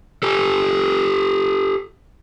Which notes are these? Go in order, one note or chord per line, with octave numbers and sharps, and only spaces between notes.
G4 A4